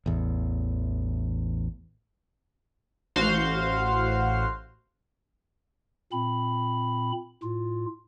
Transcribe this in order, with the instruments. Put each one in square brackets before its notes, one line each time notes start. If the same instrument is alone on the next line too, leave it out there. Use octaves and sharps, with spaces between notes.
[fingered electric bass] A1 E2
[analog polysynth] A1 F#4 C5 F5 C6
[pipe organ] A#2 C4 B5
A2 F4